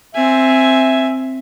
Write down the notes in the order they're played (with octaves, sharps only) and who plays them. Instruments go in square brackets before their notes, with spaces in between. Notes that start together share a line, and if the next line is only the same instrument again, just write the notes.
[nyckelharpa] C4 G#5 [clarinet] E5